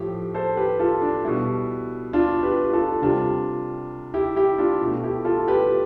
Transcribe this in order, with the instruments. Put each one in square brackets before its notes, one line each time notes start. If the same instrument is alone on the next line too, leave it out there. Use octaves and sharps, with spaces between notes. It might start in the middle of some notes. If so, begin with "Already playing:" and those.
Already playing: [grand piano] A2 F3 A3 G4
A4 C5
G4 B4
F4 A4
D4
B2 G3 E4
D4 F4
G4 B4
F4 A4
C3 G3 D4 F4
E4 G4
E4 G4
D4 F4
B2 A3
E4 G4
F4 A4
G4 B4